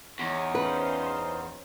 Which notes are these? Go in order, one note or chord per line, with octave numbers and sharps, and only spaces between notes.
E2 D#4 C#5
C#4 F4 B4 C5